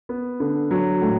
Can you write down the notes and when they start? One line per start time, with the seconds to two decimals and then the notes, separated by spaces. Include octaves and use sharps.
0.09 B3
0.40 D3
0.71 F#3
1.02 A2